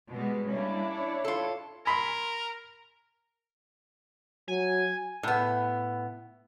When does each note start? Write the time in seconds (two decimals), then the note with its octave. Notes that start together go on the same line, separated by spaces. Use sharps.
0.11 B2 G3 G#3
0.51 G3 A#3 C#4 D4 E4 D5
0.89 C#5
1.24 F4 A4
1.86 A#4 G#5 B5 C6
4.48 F#3 G#5
5.23 A2 B3